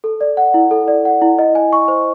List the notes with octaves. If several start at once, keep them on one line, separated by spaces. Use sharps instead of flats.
A4
D5
F#5
E4
A4
D5
F#5
E4
D#5
G#5
C#6
C5